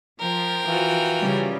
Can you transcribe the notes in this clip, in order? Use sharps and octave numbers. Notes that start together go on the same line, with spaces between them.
F3 A#4 G5
E3 F4 F#4
C#3 G3